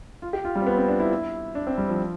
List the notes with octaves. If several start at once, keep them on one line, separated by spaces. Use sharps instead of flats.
F4
G4
F4
G3
C4
B3
C4
D4
E4
E4
D4
C4
G3
F3